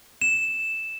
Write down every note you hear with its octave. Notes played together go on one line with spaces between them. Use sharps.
E7